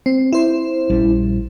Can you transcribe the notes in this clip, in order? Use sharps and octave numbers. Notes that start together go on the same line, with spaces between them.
C4
E4 C5
A#1 G3 C#4